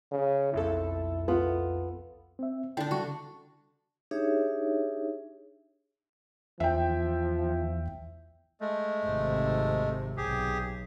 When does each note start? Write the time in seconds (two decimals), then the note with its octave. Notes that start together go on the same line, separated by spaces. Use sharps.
0.12 C#3
0.54 B1 F2 E4 A4
1.28 B3 F4
2.39 C4 E5
2.77 D3 D4 E4 G5
2.91 C#3 G3 F#4 C#6
4.11 D4 D#4 G4 G#4 C#5 E5
6.60 E2 F3 E5 G5
8.61 G#3 A3
9.05 G#1 C3
10.17 B1 G4 G#4